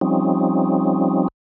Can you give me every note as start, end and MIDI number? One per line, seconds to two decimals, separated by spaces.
0.01 1.28 53
0.01 1.28 55
0.01 1.28 60
0.01 1.28 61
0.01 1.28 63